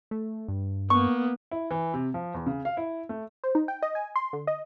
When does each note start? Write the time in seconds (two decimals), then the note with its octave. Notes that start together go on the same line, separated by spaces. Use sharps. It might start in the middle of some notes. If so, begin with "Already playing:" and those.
0.11 A3
0.48 G2
0.90 A#3 B3 C#6
1.51 E4
1.71 E3
1.94 C3
2.14 F3
2.34 E2
2.46 C#3
2.65 F5
2.77 E4
3.09 A3
3.44 C5
3.55 D#4
3.68 G5
3.82 D#5
3.95 G#5
4.16 C6
4.33 D3
4.47 D#5